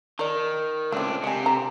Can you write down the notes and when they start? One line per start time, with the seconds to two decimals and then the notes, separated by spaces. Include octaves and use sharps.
0.19 D#3 A#4 D5
0.92 C#2 A3 C4 D4
1.24 C3 D#5 G#5
1.43 D3 A#5